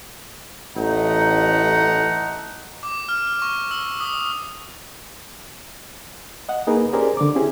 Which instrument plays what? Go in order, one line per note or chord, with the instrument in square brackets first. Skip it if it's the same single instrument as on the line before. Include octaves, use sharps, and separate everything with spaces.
[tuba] A1 [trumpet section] A3 D#4 F#5
[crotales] D6
F6
C#6
E6
D#6
[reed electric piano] D#5 F#5
A#3 D#4 G#4 A#4 B4
C#4 G4 G#4 A#4 C5 D5
D3 D6
C4 C#4 E4 G4 G#4